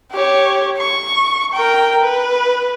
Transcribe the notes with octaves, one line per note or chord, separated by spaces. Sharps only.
G4 C#5
C#6
A#4 G5
B4